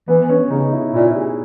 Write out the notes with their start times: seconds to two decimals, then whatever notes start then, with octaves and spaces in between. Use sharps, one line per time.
0.08 E3 B3
0.29 C#4
0.50 C#3 D#4
0.73 E4
0.94 A#2 E4
1.15 G#4